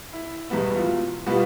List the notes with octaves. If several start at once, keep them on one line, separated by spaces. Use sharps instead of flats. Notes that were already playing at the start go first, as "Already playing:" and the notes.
E4
E2 B2 G3 B3 E4
F4
B2 G3 B3 F4